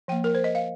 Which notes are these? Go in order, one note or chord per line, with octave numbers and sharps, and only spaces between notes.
F3 A#3 G5
A#4
C5
D#5
F5